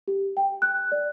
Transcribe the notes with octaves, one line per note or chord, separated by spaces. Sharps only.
G4
G5
F#6
D5